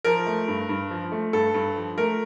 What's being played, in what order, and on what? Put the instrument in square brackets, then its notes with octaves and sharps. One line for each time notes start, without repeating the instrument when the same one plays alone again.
[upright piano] F3 A#4
A3
G2
G2
F3
A3
G2 A4
G2
F3
A3 A#4